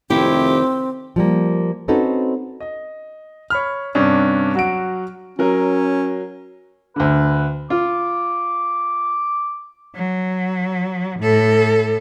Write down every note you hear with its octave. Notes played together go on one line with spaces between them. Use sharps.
F1 D#3 C4 E4 G4
F3 G3 A#3
C4 C#4 D#4 F#4 A4 B4
D#5
C#5 B5 F6
G2 C3 C#4 D4
F#3 F#4 D7
F#3 C#4 A#4
D2 D3 B4
F4 D6
F#3
A2 A4